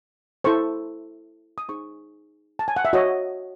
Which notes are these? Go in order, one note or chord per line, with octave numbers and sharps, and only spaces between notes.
E4 A4 C5 C#6
D#6
D#4 G#4 C5 C#6
A5
G#5
F#5
E5
F#4 C#5 D#5